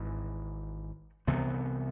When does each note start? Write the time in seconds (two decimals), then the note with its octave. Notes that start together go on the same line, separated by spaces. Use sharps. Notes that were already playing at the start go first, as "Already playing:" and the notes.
Already playing: G#1 G#2 E3
1.27 C2 C3 E3 B3